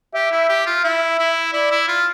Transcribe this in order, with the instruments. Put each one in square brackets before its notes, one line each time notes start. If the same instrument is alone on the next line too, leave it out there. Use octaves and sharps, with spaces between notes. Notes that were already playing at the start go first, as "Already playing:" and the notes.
[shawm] G4 [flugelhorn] E5
[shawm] E4
G4
F4
[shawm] E4 [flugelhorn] E5
[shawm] E4
[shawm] E4 [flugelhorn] D5
[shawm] E4
F4